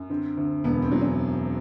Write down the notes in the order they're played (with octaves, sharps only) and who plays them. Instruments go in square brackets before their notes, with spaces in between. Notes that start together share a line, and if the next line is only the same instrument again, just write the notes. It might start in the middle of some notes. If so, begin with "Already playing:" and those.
Already playing: [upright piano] F#2
D3 C4
D2
E1 B3
C4
F#3
C#4